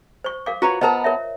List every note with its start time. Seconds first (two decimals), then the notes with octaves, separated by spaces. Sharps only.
0.24 C5 C#6
0.46 A#4 F5 D6
0.62 F4 F#4 B4 C#5 A#5
0.81 B3 A#4 C5 D#5 A5 A#5
1.04 A#4 C#5 E5